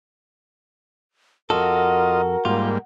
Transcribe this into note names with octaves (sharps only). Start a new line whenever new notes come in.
F2 F4 F#4 A4 A#4 D#5
G#2 G3 A#3 F4